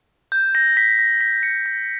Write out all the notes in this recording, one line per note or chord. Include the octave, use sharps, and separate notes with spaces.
G6
A#6
B6
A#6
B6
C#7
A#6